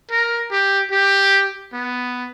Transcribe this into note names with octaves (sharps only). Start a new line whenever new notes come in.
A#4
G4
G4
B3